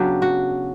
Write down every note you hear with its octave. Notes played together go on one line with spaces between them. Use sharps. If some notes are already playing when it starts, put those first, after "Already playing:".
Already playing: C#3 F#3 B3 D4 G4
F#4